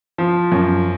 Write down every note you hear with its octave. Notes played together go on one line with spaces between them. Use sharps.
F3
F#2